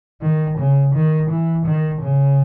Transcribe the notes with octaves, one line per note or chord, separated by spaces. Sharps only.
D#3
C#3
D#3
E3
D#3
C#3